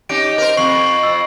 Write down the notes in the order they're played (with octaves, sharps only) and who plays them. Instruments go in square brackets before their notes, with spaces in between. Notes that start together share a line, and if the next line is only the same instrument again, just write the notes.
[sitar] C#4 D#4 G4 [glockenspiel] D7
[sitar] A#4 C5
[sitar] F2 [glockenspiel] C#6 C7 F#7
[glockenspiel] C7
E6 C7